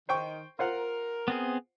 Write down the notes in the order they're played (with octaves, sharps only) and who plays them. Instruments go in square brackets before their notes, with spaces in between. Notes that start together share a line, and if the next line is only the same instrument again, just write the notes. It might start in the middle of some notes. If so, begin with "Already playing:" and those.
[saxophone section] D#3 [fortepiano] C5 G5 C#6
[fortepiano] F4 C5 F#5 [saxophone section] A#4
[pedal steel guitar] B3 C4 G#4